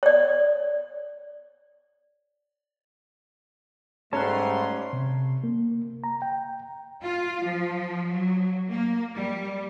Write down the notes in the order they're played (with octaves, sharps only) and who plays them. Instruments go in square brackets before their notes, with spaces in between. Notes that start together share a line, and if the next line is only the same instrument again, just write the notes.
[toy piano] C#5 D5
[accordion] G#2 A3 C6 [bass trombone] G3 [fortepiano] C#4 [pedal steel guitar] A5 A#5 F#6
[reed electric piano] C3
A#3
A#5
G5
[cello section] F4
F3
F#3
A#3
G3